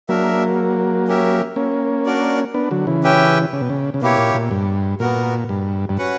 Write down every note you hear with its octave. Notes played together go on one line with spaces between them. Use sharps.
F#3 A#3 D4 A#4 E5
C#4 G4 A#4 E5
A#3 C#4
D4 F#4 A#4 D5
B3 D4
D3 F#3
C#3 E3
C#4 G4 B4 E5 G5
C#3
B2
C#3
C#3
B2 A#3 E4 G4 C#5
A#2
A#2
G2
A#2 B3 F#4 A#4
G2
G2
C#4 F#4 B4 F#5